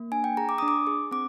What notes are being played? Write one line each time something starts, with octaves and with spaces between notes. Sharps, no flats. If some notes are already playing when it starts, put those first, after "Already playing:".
Already playing: A#3
D4 G#5
G5
G#4 A#5
D6
D4 D#6
D6
G#4
C4 D6